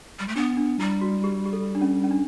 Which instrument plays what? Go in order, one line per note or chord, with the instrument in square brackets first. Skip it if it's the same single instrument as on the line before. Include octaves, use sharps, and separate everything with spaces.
[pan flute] G3
A3
[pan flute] B3 [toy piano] D4
[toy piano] D4
[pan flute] G3 [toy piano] E4
[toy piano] F#4
G4
G4
A4
D4
C#4
C#4
D4